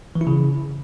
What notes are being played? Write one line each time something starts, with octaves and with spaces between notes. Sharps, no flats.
E3
E4
C#3